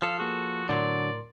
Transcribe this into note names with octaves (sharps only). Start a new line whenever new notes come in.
F3 A4 F5
A#3 F#4 G#4
A2 D3 F3 F#3 A#4 D5 C6